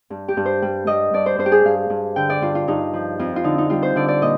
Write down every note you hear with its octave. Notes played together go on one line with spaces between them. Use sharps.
G2
G4
G2
C5
G3
G3 D#5
G2 D5
C5
G2 C5
G4
G#4
G2 F5
G2
D3 G5
D5
G2 F4
F4
G2 D#4
F3
F2 F4
F4
D3 D#4
D#4
G3 F4
C5
D3 D5
D5
A#2 D#5